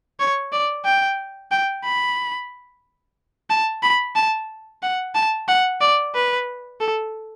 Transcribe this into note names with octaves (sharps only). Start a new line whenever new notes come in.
C#5
D5
G5
G5
B5
A5
B5
A5
F#5
A5
F#5
D5
B4
A4